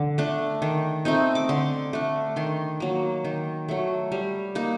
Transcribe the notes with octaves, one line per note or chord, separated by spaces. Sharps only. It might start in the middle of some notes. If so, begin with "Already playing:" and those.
Already playing: D3 D6
A3 D4
D#3
A3 C4 D#4
D6
D3 C6
A3 D4
D#3 C6
F#3 A#3
D#3
F#3 A3
G3
A#3 D#4